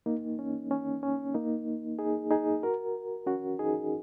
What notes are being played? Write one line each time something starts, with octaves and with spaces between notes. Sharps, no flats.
A#3 D#4
C#4
C#4
C#4
A#3 D#4
D#4 G#4
D#4 G#4
F#4 A#4
C#4 F#4
D#4 G#4